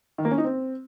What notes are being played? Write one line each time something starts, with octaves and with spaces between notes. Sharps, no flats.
D#3
A#3
C#4
D#4
C4